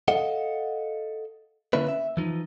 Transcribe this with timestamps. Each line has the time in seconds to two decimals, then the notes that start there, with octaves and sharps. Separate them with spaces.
0.08 A4 D#5 F5 F#5
1.73 D3 A#3 C#4 D4 E4 B4
1.88 E5
2.17 E3 F3 D#4